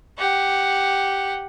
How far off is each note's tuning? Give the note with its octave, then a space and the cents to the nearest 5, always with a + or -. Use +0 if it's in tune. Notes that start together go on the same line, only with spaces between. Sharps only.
G4 +0 F#5 +0